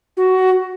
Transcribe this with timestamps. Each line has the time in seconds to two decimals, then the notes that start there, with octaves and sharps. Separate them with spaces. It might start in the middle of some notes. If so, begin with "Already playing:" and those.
0.17 F#4